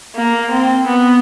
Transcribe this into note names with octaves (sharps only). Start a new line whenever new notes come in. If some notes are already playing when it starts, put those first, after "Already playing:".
A#3
C4
B3